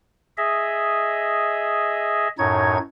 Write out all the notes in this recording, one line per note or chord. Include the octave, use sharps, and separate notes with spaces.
G#4 D#5 E5
F#2 A2 D#4 C#5 G#6